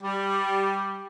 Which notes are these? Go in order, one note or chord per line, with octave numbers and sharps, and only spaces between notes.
G3